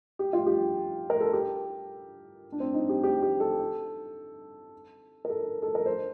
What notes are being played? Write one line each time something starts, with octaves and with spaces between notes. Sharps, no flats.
G4
F4
G4
A#4
A4
G4
D4
C4
D#4
G4
G4
G4
A4
A#4
A4
A4
A#4
C5